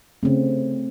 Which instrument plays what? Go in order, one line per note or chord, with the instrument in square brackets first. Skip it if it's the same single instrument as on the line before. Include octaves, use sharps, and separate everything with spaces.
[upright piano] C#3 [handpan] A3 C4